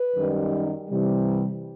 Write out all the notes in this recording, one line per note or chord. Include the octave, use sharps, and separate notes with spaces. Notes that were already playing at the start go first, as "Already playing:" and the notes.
Already playing: B4
F#2 D#3 G3
C3 E3 G3